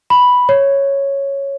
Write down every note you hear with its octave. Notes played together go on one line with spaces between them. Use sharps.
B5
C#5